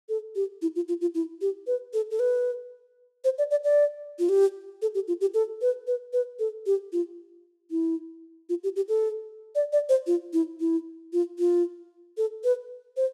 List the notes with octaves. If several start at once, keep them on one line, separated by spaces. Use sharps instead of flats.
A4
G4
E4
F4
F4
F4
E4
G4
B4
A4
A4
B4
C5
D5
D5
D5
F4
G4
A4
G4
F4
G4
A4
B4
B4
B4
A4
G4
F4
E4
F4
G4
G4
A4
D5
D5
C5
F4
E4
E4
F4
F4
A4
B4
C5